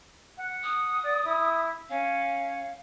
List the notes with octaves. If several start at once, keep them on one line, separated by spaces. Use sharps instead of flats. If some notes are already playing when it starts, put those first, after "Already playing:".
F#5
D#6
D5
E4
C#4 F5